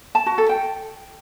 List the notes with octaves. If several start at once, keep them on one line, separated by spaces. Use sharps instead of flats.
A5
F#4
A4
G5